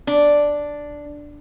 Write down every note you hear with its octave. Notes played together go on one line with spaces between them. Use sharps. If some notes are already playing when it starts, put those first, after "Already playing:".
D4